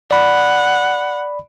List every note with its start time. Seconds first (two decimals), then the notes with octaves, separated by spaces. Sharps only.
0.11 D5 F#5 B5